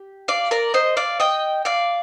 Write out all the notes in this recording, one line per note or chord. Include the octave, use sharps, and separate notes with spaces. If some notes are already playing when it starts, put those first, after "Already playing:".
Already playing: G4
D5 F5
A#4 D5
C5 D#5
D5 F5
D#5 G5
D5 F5